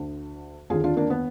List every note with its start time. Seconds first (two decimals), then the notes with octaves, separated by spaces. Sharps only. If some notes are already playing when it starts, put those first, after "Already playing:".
Already playing: D2 D3
0.70 D#2 D3 F4 G#4
0.84 D4 F4
0.97 A#3 D4
1.10 B3